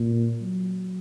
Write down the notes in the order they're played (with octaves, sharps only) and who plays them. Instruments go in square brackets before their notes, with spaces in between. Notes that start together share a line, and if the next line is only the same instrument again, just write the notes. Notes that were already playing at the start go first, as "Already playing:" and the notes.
Already playing: [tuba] A#2
F#3